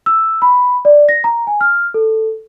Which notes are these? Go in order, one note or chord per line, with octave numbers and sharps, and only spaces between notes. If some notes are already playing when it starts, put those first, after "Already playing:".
E6
B5
D5
A#6
A#5
G#5
F6
A4